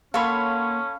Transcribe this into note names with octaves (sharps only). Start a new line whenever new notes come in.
A#3 C#4 A4 C#5 F5 F#5 B5 C6